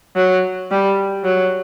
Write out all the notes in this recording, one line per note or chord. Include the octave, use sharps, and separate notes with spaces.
F#3
G3
F#3